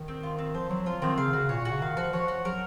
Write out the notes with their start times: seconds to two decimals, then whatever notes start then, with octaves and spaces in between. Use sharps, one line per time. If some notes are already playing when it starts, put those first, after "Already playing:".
Already playing: D#3
0.08 C4
0.23 F4
0.39 C4
0.55 F3 C5
0.70 F#3 C4
0.86 F3 F4
1.02 D#3 C4
1.18 C#3 F5
1.33 C#3 F#4
1.49 A#2 C#5
1.60 A#2
1.65 F#4
1.71 C#3
1.81 D#3 F5
1.97 F3 F#4
2.13 F3 C#5
2.28 F#4
2.45 F#3 A#4